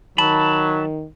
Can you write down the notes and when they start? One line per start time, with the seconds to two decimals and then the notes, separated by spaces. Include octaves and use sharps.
0.18 D#3 F#3 A5 B5